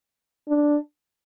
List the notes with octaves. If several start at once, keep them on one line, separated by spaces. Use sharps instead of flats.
D4